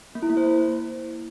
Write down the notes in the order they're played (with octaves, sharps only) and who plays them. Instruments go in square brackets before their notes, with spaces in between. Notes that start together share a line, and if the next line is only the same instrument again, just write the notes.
[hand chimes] A#3
E4
A#3
C5